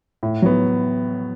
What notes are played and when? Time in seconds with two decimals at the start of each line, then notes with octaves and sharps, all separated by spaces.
0.23 A2
0.42 F#3 B3